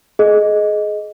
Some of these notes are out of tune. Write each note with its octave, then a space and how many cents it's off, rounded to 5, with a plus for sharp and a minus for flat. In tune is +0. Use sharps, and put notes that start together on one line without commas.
G#4 +25 D#5 +0